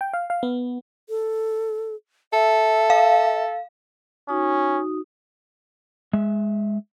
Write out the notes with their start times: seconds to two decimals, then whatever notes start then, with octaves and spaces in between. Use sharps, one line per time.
0.01 G5
0.13 F5
0.30 F5
0.43 B3
1.09 A4
2.33 A4 E5
2.90 F5
4.29 C#4 D#4 F#4 D#6
6.13 G#3 E5